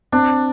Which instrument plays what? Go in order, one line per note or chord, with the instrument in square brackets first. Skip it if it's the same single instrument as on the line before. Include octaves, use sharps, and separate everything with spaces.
[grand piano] C4 [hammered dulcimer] D4